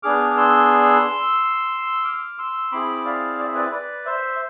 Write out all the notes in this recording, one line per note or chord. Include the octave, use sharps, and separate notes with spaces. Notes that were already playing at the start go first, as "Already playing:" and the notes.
B3 D4 G#4 D6 F6
D6
C6 E6
D6 F6
C6 E6
C4 E4 G#4 B5 D6
D5 F5
D5
E5
B4 D5
B4 D5
C5 E5